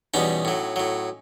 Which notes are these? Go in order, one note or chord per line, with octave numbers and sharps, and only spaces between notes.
E2 B2 G3 C#4 D#4
A2 F#3
A2 F#3